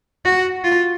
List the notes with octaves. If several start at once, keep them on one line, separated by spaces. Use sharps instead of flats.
F#4
F4